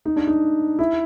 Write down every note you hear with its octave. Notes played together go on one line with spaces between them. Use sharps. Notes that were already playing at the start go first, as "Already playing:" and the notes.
D#4
D4
D#4
E4